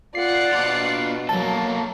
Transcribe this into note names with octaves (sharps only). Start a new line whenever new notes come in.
F4 D5 F#5 C7
B2 D4 F4
F#3 A#3 A4 A5